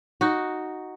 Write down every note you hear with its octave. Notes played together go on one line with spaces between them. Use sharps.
D#4 F#4